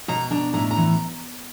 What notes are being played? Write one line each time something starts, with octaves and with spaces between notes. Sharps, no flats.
B2 A#5
D4 A#5
A2 A#5
A#5
E3